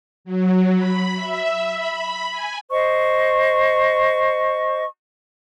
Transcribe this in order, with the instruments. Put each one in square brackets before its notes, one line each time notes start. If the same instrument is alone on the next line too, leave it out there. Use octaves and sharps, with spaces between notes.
[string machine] F#3
B5
E5
B5
G#5
[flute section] C5 D#5 C#6